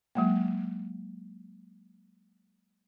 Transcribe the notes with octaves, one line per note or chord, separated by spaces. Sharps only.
F#3 G#3 A#3